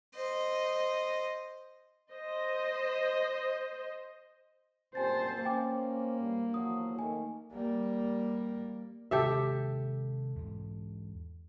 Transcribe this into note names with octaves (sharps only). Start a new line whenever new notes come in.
C5 D#5
C5 D#5
F#2 A#2 C4 G4 C5 G#5 A5 A6
A#3 C#4 B4 C5 G5 G#5 D6
G2
E2 F3 F#3 D#6
D#3 A3 G#5
G3 A#3
C3 D#3 G#3 G4 A4 E5
E2 G#2